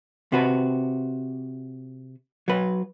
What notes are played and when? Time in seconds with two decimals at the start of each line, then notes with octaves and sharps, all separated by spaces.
0.32 C3 F#4 B4
2.48 F#3 B4